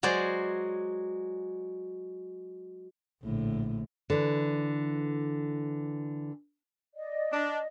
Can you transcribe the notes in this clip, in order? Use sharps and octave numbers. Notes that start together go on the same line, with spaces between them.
F#3 G#3 C5 D5
A#1 A2 D3
D3 E3
D5 D#5
D4